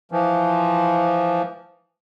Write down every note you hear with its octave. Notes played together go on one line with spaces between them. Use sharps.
E3 F3